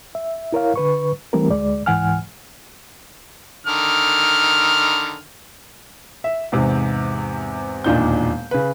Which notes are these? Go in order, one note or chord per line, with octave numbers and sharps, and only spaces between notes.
E5
E4 A#4 C#5 F5
D3 B4 C#6
E3 G3 A3 C4 G4 A#4
D2 G#3 D5
C#2 G#2 E3 F#5 G#5 F6
D3 D#3 F6
E5
E2 G#2 C3
E1 D#2 A#2 D4 D#4 G6
C#3 B4